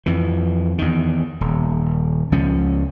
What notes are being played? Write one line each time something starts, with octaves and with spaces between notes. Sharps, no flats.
F2 E3
E2 D#3
D#1
C#2 F3 C#4